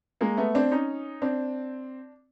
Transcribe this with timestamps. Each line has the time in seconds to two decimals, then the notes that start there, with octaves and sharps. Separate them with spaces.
0.21 G#3 A#3
0.37 A3 B3
0.55 C4 D4
0.71 C#4 D#4
1.22 C4 D4